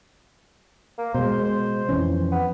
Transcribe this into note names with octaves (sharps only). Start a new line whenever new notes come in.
A#3
B2 G#3 C5
C5
F2 E3 C#4
B3